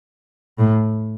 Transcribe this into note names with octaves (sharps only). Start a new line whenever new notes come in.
A2